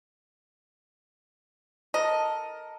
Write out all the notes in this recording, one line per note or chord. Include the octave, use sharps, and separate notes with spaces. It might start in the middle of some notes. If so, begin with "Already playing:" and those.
A4 A#4 D#5 A5